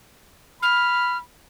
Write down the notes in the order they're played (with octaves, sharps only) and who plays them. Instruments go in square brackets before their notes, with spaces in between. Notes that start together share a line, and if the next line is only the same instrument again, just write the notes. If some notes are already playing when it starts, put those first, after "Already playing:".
[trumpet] B5 [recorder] F6